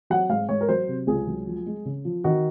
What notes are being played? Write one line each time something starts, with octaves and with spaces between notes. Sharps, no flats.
F#3 F#5
G#2 F5
G#2 C#5
A#4
F#3 C5
C3
C#2 G#4
F#3
F3
G#3
C#3
F3
D#3 F#4